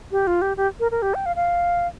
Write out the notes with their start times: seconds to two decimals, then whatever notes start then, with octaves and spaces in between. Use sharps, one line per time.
0.12 G4
0.27 F4
0.42 G4
0.57 G4
0.80 A#4
0.91 A#4
1.02 G4
1.14 G5
1.26 F5
1.36 F5